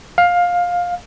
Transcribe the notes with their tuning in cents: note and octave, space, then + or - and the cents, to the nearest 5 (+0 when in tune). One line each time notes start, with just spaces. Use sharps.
F5 +15